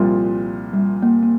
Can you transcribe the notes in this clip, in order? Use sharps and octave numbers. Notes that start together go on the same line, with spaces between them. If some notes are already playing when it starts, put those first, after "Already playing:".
Already playing: C2 A#2 F3 G3 C4 F4
G3
A#3
A#3